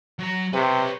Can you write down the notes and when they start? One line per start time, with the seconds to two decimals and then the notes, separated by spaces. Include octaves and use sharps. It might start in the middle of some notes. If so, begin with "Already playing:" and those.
0.19 F#3 A#5
0.53 C3 B4 C#5